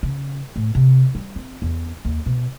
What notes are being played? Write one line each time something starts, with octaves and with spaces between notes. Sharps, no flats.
C#3
A2
C3
G3
C4
E2
D#2
B2